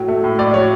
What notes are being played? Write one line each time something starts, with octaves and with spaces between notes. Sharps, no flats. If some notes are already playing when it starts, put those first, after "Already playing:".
Already playing: A2 F#3
A3
A2
A2 D5
F#3 C#5